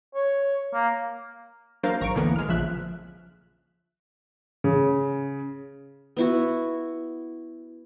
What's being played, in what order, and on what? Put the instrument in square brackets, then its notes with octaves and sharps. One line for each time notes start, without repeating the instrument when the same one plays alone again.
[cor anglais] C#5
A#3
[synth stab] F#3 A#3 D4 A#4 C5 F5
G#1 A#5 C#6 D7
D2 A2 D3 E3 A#3 B3
G#3 F6
A#1 C#3 F3 E5 F#6
[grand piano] C#3
[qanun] B3 E4 F#4